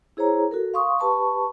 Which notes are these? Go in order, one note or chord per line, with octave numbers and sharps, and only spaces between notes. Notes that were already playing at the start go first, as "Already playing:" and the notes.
E4 G#4 C5 C#5 A#5
F#4 A4 A#4
F5 C6 C#6 D#6
G4 B4 A5 B5 C#6